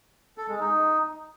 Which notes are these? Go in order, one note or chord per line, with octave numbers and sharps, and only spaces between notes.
A4
G#3
D#4